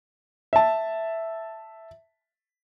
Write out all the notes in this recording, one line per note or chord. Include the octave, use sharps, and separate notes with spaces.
E5 A5